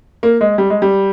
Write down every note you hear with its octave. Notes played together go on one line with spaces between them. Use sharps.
A#3
G#3
G3
G#3
G3